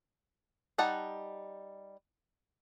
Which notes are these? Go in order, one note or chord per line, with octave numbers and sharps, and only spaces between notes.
G3 D#4 F#5 A5